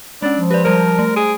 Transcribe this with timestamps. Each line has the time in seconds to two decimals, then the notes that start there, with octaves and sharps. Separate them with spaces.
0.22 G#3 C#4 D4
0.37 F3
0.51 G4 B4 D5
0.64 G3 A#4 C5 D5
0.99 A3
1.16 G#4 D7